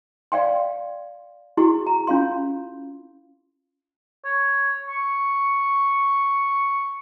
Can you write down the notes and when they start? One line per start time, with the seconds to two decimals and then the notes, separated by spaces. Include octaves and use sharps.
0.32 D5 F5 G5 C6
1.57 E4 F#4 G#4 C6 C#6
1.87 A#5
2.07 C#4 F4 F5 C6
4.25 C#5
4.89 C#6